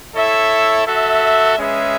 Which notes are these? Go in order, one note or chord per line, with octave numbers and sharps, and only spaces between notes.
E4 A4 C#5 E5
F#4 A4 E5
G#3 C#4 G#4 B4 E5